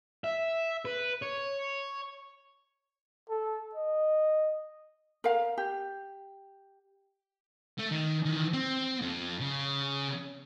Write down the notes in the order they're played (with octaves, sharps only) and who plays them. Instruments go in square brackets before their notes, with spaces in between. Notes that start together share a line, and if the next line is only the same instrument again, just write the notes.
[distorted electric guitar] E5
B4
C#5
[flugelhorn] A4
D#5
[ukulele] A#4 F5
G4
[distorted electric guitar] A3
D#3
D#3 E3
C4
F2
C#3